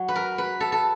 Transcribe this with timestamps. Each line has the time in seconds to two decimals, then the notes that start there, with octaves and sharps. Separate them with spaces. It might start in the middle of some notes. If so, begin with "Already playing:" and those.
Already playing: F#3
0.08 B4
0.16 A#4
0.38 B4
0.60 A4
0.72 A4